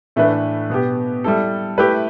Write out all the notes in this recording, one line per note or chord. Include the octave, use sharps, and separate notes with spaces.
A2 E3 A3 D4 B4
B2 B3 G4
G3 E4 A4
A3 E4 G4 B4